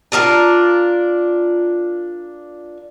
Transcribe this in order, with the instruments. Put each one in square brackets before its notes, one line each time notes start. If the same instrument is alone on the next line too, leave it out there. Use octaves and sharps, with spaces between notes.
[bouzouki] D4 F4 G4 A#4